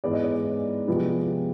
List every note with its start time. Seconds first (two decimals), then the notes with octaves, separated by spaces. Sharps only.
0.04 G#2 E3 G#3 B3 D5
0.13 D#5
0.23 D5
0.88 C3 F3 G#3 B3